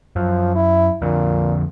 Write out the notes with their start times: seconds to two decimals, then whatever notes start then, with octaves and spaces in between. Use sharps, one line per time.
0.16 F#2 F3
0.55 E4
1.02 F2 A#2 D3